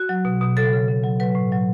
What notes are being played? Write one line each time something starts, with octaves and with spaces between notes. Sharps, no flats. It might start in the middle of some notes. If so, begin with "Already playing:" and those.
Already playing: F#4
F#3
B2
B2
C#3 A4
C#3
C#3
F#3
F#3 B4
A2
F#3